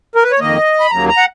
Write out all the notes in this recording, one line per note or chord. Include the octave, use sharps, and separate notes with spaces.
A#4
B4
C#5
F2 D#3 A#3 D#5
B5
D#2 C#3 F#3 A#3 A#5
A#5
F#5